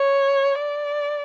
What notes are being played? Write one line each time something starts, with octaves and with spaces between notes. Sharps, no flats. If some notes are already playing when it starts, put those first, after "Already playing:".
Already playing: C#5
D5